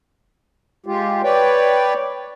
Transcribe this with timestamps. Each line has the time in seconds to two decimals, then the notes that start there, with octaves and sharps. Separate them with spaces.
0.86 G#3 F4 G4
1.23 B4 C#5 D5 G5